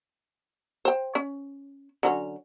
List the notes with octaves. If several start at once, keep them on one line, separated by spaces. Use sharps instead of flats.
C5 G5
C#4
D3 F#3 C#4